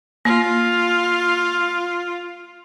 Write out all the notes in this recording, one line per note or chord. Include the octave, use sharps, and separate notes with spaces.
A#3 F4